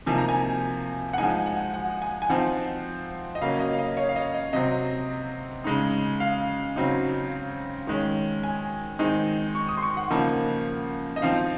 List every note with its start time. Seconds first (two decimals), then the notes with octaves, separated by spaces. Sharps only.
0.06 C3 F3 A#3 D#4 G#5
0.18 A#5
0.29 G#5
1.14 F#5
1.18 F3 G#3 D#4 G#5
1.46 F#5
1.74 F#5
2.02 G#5
2.22 G#5
2.30 F3 C4 D#4 F#5
3.35 D#5
3.41 C#3 F#3 A#3 C#4 F5
3.60 D#5
3.73 F5
3.79 D#5
3.97 C#5
4.09 F5
4.16 D#5
4.34 D#5
4.53 C3 F#3 C4 D#5
5.64 C#3 G#3 D#4
6.20 F5
6.76 C#3 F#3 C4 D#4
7.87 D#3 G#3 C#4
8.43 G#5
8.99 D#3 G#3 C4 D#4
9.55 C#6
9.69 D#6
9.77 C6
9.82 C#6
9.97 F#5
10.10 C#3 F3 A#3 D#4
11.16 D#5
11.22 F3 C4 D#4 F5